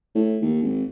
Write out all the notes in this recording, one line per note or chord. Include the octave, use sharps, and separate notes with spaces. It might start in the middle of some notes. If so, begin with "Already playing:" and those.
A2
D#2
G#1